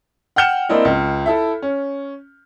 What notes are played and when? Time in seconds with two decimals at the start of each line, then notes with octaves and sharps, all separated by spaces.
0.36 F#5 G5 F6 G6 C#7 E7
0.69 A#3 C4 D4 E4 D#5
0.85 C#2
1.26 E4 A4 E5
1.62 C#4